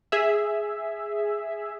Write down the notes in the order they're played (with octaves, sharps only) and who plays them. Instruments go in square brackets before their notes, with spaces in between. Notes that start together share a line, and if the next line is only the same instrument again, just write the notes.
[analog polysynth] G#4 E5